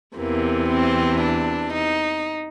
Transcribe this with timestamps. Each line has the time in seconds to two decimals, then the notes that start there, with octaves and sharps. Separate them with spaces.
0.16 E2 C3 E3 A#3
0.68 C4
1.20 D4
1.72 D#4